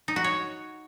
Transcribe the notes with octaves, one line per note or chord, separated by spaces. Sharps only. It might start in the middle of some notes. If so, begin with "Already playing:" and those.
D#4
F#4
C#5